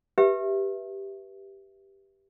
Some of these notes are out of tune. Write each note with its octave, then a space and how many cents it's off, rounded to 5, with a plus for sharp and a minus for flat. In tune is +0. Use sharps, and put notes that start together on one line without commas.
G4 +0 B4 -20 E5 +0